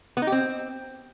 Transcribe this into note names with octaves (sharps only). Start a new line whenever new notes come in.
B3
D#4
G4
C4